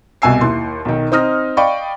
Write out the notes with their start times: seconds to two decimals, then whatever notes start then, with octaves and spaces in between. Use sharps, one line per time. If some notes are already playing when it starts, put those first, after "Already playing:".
0.22 C2 B2 G#5 E6 C7
0.41 D#2 E4 C6
0.85 B1 D#3
1.12 C4 D#4 D#6 F6 A#6
1.57 D5 D#5 F5 G5 B5 C#6